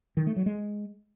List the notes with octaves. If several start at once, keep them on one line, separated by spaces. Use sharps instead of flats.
D#3
A3
F#3
G#3